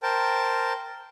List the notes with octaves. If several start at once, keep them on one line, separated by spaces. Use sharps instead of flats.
A#4 C5 G5 A5